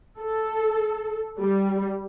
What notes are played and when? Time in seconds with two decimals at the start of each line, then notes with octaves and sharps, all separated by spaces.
0.19 A4
1.39 G3